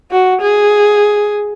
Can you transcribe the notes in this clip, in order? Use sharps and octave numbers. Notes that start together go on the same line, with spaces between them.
F#4
G#4